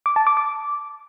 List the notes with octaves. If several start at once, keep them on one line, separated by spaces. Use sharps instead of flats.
D6
A5
D6
D6